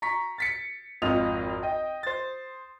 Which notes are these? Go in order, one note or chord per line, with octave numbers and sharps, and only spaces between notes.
A#5 C#6 B6
A6 B6 C#7
G#1 F2 F4 D#5 D#6 F7
D#5 G5
C5 A6